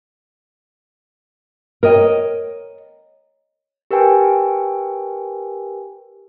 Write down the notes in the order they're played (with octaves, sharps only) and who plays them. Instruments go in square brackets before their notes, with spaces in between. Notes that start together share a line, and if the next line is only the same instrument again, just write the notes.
[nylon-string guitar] A#4 C#5 D#5 G5
[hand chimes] G4 A#4 B4 G5 G#5